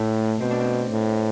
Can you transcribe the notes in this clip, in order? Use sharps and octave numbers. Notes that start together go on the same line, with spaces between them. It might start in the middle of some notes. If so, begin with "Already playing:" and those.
Already playing: A2 A3
B2 C4
D4
C4
A2